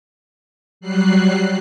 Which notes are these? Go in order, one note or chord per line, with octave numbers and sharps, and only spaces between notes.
F#3 G3 F#6 C7